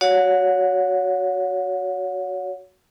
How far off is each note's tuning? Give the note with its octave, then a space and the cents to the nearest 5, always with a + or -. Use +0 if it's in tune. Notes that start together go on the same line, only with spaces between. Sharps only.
F#4 +0 C#5 +25 F#5 -35